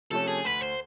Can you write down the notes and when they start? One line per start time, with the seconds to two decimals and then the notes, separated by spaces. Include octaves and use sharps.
0.11 C3 F3 A3 C#4 A4
0.28 G#4
0.44 D2 B4
0.61 C5